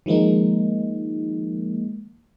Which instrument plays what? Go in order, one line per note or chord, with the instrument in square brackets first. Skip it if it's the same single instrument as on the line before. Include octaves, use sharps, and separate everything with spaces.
[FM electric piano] D#3 F3 G#3 A#3 D#4